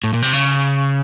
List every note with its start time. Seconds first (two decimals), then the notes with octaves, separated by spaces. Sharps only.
0.04 A2
0.14 A#2
0.22 C3
0.33 C#3